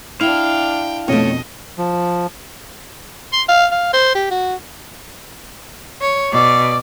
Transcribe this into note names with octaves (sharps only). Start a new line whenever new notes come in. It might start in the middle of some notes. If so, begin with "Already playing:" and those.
D4 E4 F5 G5
F2 B2 A3 C#5 D#5
F3
C6
F5
F5
C5
G4
F#4
C#5
B2 D5